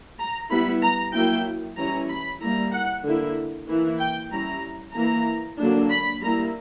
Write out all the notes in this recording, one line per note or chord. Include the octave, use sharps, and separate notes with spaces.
A#5
G3 B3 E4 B5
A#5
F#3 A#3 E4 G5
E3 G3 C#4 E4 A#5
B5
G3 A#3 E4 A#5
F#5
D3 A#3 E4
E3 A#3 E4
G5
G3 C#4 E4 A#5
E3 A#3 E4 A#5
D3 F#3 A#3 D4
B5
G3 A#3 E4 A#5